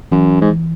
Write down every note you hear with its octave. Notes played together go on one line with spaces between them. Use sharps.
F#2 E3
G#2
E3